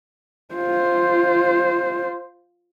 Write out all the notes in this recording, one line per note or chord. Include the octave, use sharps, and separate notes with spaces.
F4 C5